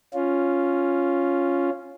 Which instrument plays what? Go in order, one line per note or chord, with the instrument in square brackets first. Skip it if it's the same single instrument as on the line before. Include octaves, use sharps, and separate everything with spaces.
[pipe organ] C#4 F4